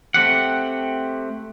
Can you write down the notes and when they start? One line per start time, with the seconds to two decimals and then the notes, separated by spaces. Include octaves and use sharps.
0.14 A3 C4 G4 F#5